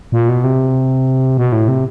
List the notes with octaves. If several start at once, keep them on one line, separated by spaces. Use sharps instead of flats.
A#2
B2
C3
B2
A2
C3